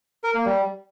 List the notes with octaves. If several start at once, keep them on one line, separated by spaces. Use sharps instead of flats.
A#4
A#3
G3